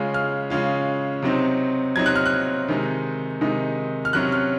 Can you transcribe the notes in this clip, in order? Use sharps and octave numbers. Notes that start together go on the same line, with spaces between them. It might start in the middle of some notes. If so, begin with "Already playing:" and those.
Already playing: C#3 G#3 C#4 F4
F6
C#3 G#3 C#4 F4
C3 F#3 C4 D#4
C3 F#3 C4 D#4 G#6
F#6
F6
F#6
C3 D#3 G#3 D#4
C3 D#3 G#3 D#4
F6
C3 F#3 C#4 F#6
F6